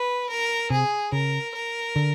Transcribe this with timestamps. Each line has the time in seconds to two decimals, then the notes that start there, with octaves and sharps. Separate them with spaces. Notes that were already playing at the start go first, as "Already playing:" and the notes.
Already playing: B4
0.29 A#4
0.70 C3 G#4
1.12 C#3 A#4
1.54 A#4
1.96 D3